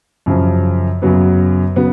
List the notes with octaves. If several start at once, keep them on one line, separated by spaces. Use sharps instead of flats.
F#2 C#3 F3
F#2 C#3 F#3 B3
C#3 F#3 B3